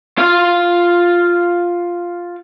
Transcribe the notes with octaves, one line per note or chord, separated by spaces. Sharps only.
F4 F5